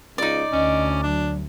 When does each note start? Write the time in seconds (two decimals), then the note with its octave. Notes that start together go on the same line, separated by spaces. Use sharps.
0.18 C#2 D#4 D5
0.52 D2 C#4 D#5
1.03 F#3 D4